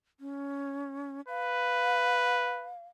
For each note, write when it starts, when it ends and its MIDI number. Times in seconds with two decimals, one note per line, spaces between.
0.20 1.21 61
1.28 2.73 71
1.28 2.85 77